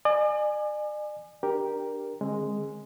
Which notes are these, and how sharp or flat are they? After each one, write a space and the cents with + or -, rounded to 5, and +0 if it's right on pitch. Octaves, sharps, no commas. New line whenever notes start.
D5 +45 G#5 +0
D4 +10 G4 +0 A#4 +10
D3 +30 G#3 +0 C4 +40